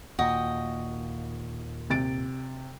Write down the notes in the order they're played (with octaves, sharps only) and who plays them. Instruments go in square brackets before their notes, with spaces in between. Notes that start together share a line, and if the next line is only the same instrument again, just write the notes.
[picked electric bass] D#2 A#2 [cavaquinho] F#4 D#5 G5
[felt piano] C3 A6 D7